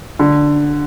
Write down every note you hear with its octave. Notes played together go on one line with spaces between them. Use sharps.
D3